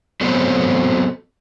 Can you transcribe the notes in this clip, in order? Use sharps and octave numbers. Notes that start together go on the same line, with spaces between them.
F#3 B3 C4 A4 C5 C#5